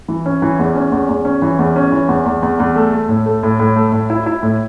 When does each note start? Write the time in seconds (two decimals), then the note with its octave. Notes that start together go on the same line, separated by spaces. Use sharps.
0.08 E3
0.26 C#4
0.42 E3
0.59 E2
0.75 C#4
0.92 E2
1.09 E2
1.25 C#4
1.42 E3
1.59 E2
1.76 C#4
1.92 E3
2.08 E2
2.26 E2
2.42 E2
2.59 E2
2.76 A3
2.92 A3
3.09 A2
3.26 A3
3.43 A2
3.59 A2
3.76 A3
3.92 A2
4.10 E4
4.26 E4
4.43 A2